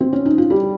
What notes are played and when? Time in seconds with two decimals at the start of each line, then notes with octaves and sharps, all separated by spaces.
0.01 C4
0.13 C#4
0.26 D#4
0.38 F4
0.50 G3 G4